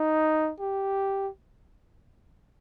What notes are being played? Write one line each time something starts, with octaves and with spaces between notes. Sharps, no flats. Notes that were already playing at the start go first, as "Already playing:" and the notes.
Already playing: D#4
G4